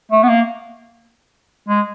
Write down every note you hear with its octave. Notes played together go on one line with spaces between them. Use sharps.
A3
B3
A#3
G#3